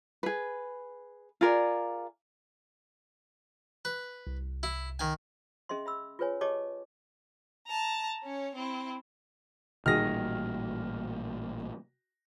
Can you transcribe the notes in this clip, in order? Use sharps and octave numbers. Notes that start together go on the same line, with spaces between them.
G#4 B4
F4 G#4 A#4 D5
B4
C2
E4
D#3 G#5
C#4 G#4 D#5 E5 C6
E5 B5 E6
F4 G#4 B4 C#5 G#5
G4 G#4 C#5 D#5 A5 D6
A5 A#5
C#4 C#5
C4 E4
A1 A#2 D#3 G3 F#4 G#4 F6 A#6